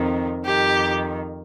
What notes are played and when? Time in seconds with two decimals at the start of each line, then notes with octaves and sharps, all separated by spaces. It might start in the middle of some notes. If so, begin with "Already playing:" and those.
Already playing: F2 C3 D#3
0.45 F2 D#3 G4